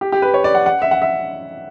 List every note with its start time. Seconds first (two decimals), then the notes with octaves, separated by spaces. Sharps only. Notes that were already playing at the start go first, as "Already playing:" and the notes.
0.01 G4
0.12 G4
0.22 B4
0.34 C#5
0.44 D5
0.55 F#5
0.66 F#5
0.82 E5
0.91 F#5
1.02 E5